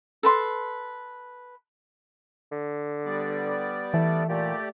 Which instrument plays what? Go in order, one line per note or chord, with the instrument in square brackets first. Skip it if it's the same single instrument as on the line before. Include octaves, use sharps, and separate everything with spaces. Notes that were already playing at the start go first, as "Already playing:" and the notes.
[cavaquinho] A4 B4 C6
[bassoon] D3
[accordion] G3 B3 D5
[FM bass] E3 [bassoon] A3
[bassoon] A#2 [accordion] A3 G4 D5